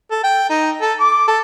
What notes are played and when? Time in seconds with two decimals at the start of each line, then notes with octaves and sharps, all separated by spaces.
0.11 A4
0.24 G5
0.50 D#4
0.81 A4
1.00 D6
1.28 A4